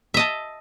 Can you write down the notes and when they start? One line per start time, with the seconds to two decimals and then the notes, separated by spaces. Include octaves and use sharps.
0.14 E5
0.17 D#5
0.19 A5